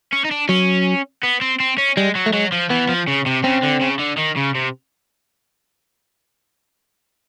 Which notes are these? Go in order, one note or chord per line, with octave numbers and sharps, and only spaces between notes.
C#4
D#4
D4
F#3 C#4
B3
C4
C4
C#4
G3 G#3
F#3
A3
F#3 G#3
F3
E3 B3
F3
C#3
C3
C#3 C4
D3
C#3
D3
D#3
C#3
C3